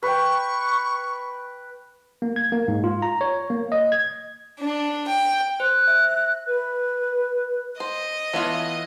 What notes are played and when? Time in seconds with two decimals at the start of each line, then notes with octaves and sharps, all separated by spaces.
0.03 B4 G5 C#6
2.22 A#3
2.36 G#6
2.52 A#3
2.68 G#2
2.84 F4
3.02 A#5
3.21 C#5
3.50 A#3
3.72 D#5
3.92 G#6
4.60 D4
5.07 G5
5.60 C5 F#6
5.87 E5
6.47 B4
7.80 C5 D#5
8.33 E3 A3 B3 E4 F4 C#5